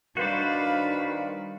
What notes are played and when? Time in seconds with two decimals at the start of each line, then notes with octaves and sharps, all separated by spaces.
0.17 D#3 G3 D4 F#4 B4 C5 D5 F5